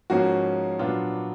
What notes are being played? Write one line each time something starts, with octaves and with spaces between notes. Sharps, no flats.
G#2 F3 A#3 C#4 F#4
A#2 F#3 B3 D4 F4